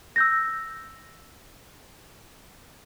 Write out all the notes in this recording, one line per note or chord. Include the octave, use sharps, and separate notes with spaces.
E6 G6 A#6